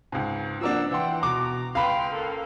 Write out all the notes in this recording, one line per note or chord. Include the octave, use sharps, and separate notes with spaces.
C#2 G#2
F3 A#3 D4 F#5 E6
E3 F#5 G5 C6
B2 A#5 D6
C#2 B4 F5 G5 B5 C6
A#3 A4